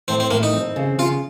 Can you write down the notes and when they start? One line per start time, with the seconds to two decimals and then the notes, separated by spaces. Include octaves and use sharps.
0.08 A2 C4
0.20 C4
0.31 A2 A#3
0.43 D#4
0.54 C4
0.76 C#3
0.99 C#3 F4